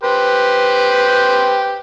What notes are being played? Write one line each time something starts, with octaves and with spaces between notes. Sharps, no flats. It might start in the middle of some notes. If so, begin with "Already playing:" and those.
G4 B4 C5